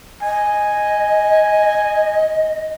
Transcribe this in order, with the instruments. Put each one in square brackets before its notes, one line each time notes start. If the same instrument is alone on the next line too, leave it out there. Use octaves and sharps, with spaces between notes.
[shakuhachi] D#5 [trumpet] G#5